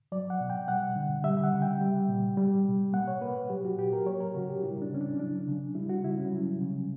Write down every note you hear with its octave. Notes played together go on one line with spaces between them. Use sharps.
F#3 D5
F#5
B2
G5
G3 F#5
D3
G3 E5
F#5
C#3
G5
G3
A#2
G3
B2
A#3 F#5
C#5
A#3 B4
F#3 G4
F#4
A#2 G4
A#4
F#3 C#5
A#4
C#3 F#4
G4
G3 E4
D4
C#3 C#4
D4
F#3 D4
C#3
G3 E4
F#4
C#3 E4
C#4
F#3
C#3